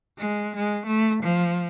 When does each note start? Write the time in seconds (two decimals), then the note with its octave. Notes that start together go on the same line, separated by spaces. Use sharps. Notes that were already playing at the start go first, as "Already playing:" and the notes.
0.18 G#3
0.56 G#3
0.86 A3
1.23 F3